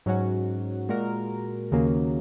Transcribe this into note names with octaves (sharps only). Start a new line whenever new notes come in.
G#2 F#3 C#4 F#4
A#2 G#3 F#4 A#4
D#2 C#3 F#3 A#3